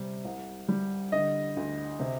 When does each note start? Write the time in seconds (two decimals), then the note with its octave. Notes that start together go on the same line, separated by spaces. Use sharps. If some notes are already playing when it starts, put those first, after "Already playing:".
Already playing: C3 G3
0.25 C2
0.69 G3
1.12 D3 D#5
1.57 D2
2.00 C3